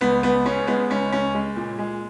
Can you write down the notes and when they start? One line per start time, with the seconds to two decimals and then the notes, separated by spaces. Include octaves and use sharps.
0.01 C#2 B3
0.23 C#2 B3
0.45 C#3 C#4
0.67 G#3 B3
0.90 C#2 C#4
1.12 C#2 C#4
1.35 G#3
1.56 A#2
1.79 G#3